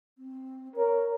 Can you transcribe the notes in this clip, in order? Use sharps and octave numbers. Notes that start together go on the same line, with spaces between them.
C4
A#4 C#5